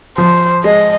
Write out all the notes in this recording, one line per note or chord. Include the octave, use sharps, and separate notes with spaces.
F3 C5
G#3 D#5